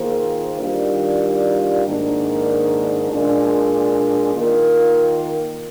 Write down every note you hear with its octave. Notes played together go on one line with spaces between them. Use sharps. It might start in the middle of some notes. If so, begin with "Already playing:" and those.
Already playing: D#3 A#3 F4 G#4 C5
D#3 G3 D4 F4
G#2 D#3 A#3 D4
A#2 G#3 D4
D#3 A#3 F4 A#4